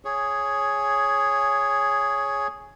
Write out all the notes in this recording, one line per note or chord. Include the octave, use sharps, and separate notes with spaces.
G#4 C#5